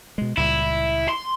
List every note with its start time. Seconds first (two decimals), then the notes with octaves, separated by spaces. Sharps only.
0.18 B2 G#3
0.37 C#2 A#2 G3 E4
1.09 C6